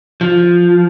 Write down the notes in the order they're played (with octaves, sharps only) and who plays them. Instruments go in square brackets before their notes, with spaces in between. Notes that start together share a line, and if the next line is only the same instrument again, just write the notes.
[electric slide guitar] F3